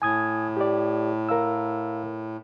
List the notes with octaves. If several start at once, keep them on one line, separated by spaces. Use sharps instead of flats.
A2 G#5 D#6 G#6
G4 D5
A#4 F5 E6